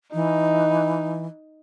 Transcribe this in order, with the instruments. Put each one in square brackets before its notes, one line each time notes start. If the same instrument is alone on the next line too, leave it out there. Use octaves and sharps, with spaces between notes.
[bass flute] E3 [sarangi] D#4